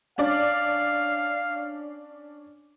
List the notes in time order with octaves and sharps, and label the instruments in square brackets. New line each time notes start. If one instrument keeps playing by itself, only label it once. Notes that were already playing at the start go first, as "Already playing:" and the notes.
[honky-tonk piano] C#4 D4 D5 [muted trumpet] F5